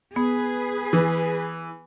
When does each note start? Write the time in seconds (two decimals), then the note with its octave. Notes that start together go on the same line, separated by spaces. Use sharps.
0.16 B3 G#4 B4
0.93 E3